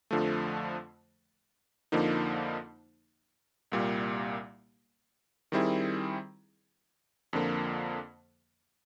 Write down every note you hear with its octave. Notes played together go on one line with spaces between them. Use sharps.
F2 D3 F3 A3
F2 D3 F3 A#3 D#4
C2 A#2 G3 A#3
D#3 G3 C4 E4 G#4
F2 D3 F3 A#3